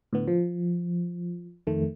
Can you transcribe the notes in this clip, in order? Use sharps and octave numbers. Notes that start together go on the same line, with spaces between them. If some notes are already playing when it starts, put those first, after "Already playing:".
A2 D3 B3
F3
F2 D#3 A3